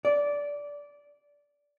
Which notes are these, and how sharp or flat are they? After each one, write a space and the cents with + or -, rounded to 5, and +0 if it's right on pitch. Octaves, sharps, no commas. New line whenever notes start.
D5 -15